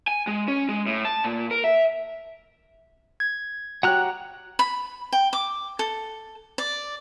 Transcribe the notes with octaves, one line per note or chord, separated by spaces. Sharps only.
G#5
G#3
C#4
G#3
A2
A5
A#2
A#4
E5
G#6
F#4 G4 C#5 F#5 A#5 F#6
B5
G5
D6
A4
D5